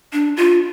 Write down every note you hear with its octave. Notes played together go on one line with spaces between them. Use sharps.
D4
F4